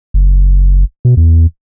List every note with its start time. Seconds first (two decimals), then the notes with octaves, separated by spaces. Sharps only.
0.14 F#1
1.05 B2
1.17 E2